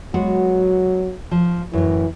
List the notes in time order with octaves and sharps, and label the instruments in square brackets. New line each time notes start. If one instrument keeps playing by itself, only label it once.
[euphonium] F#3 [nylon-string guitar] G#3 B3 F#4
[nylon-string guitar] F3
[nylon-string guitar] F#2 A2 [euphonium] E3